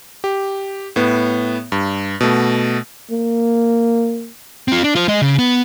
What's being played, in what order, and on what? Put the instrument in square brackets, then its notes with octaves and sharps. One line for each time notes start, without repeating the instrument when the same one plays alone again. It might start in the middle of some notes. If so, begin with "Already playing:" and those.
[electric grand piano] G4
A2 B3
G2
B2 A3
[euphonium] A#3
[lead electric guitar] C4 F4
D4
F4 C5
G#3 D#5
C#3
B3